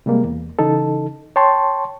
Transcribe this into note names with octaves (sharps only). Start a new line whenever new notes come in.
C3 G3 G#3 A#3
E2
C#3 E3 D#4 A4
C#5 G5 A5 C6 C#6